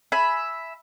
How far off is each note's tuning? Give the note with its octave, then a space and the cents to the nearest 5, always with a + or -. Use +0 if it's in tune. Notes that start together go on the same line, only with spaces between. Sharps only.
E5 +0 G#5 +10 B5 +0